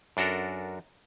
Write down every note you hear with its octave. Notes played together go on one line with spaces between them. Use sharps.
F#2 D4 F#4 A4 A#4